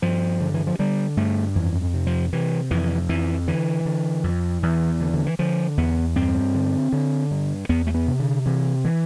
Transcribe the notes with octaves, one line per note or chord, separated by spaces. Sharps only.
G2 F3
D3
E3
F3
D3 G3
G2 A3
F2 E3
C3
F3
C3 E3
F2 E3
F2 E3
D3 E3
D3
F2
E2 E3
D3 E3
D3
E3
D3 F3
E2 B3
G2 C4
D3
D3
G2
E2 B3
A3
B3
C3
D3
C3 E3
E3